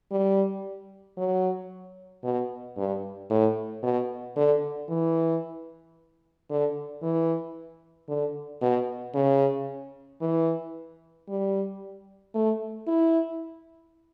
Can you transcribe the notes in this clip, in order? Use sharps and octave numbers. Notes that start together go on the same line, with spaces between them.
G3
F#3
B2
G2
A2
B2
D3
E3
D3
E3
D3
B2
C#3
E3
G3
A3
E4